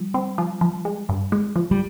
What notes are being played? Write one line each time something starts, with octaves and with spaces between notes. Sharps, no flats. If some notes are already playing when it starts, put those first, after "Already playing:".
Already playing: F3 G3
C4
F3
F3
G#3
G2
G#3
F3
G3